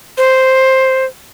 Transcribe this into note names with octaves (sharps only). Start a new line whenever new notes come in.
C5